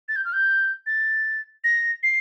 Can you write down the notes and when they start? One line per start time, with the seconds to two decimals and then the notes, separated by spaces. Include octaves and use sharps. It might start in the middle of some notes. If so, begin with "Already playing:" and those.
0.09 A6
0.16 G6
0.25 F6
0.33 G6
0.86 A6
1.64 A#6
2.03 C7